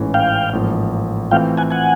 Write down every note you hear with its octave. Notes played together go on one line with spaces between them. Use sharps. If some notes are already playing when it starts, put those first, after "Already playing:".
Already playing: A1 G#2 E3 A3 C#4
F5 G5
A1 G#2 F3 A#3
E3 A3 C4 F4 F5 G5
F#5 G#5
F#5 G#5